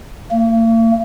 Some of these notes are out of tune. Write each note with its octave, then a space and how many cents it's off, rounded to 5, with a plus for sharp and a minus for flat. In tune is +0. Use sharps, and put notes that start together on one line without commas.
A#3 -45